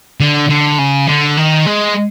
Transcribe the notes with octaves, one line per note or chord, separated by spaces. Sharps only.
D3
D3
C#3
D3
D#3
G#3